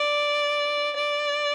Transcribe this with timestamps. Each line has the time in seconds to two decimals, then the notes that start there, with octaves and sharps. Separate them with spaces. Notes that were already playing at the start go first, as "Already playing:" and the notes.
Already playing: D5
0.96 D5